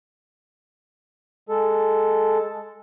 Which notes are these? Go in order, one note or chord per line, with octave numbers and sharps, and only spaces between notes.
G#3 A4